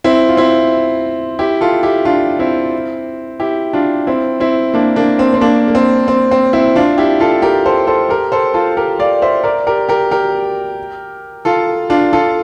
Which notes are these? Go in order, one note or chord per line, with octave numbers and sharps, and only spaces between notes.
C4 E4
F4
C4 E4
E4 G4
F4 A4
E4 G4
D4 F4
C4 E4
E4 G4
D4 F4
C4 E4
C4 E4
A#3 D4
A#3 D4
C4
C4
A#3 D4
A#3
C4
C4
C4
C4 E4
D4 F4
E4 G4
F4 A4
G4 A#4
A4 C5
A4 C5
G4 A#4
A4 C5
F4 A4
G4 A#4
D5 F5
C5 E5
A#4 D5
G4 A#4
G4 A#4
G4 A#4
F4 A4
D4 F4
F4 A4